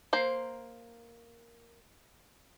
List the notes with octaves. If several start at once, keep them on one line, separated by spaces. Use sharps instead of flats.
A#3 C5